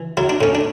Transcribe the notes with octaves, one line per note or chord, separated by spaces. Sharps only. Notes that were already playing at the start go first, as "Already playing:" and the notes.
Already playing: E3
F#3 E4
D4
A2 C#4
D4